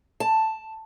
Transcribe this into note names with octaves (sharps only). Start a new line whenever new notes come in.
A5